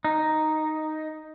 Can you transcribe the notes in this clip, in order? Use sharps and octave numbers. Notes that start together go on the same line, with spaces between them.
D#4